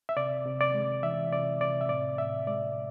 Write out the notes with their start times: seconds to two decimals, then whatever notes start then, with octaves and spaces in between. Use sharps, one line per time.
0.09 E5
0.17 C3 D5
0.46 C3
0.61 D5
0.74 G#3
1.03 E3 E5
1.32 C3 D5
1.61 C3 D5
1.81 E5
1.89 A2 D5
2.18 A2 E5
2.47 G#3 D5